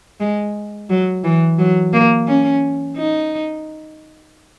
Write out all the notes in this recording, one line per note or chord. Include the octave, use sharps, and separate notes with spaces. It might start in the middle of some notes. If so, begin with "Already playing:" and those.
G#3
F#3
E3
F#3
A#3
C#4
D#4